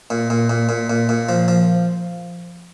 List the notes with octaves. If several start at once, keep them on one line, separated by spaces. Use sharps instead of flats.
A#2
A#2
A#2
A#2
A#2
A#2
F3
F3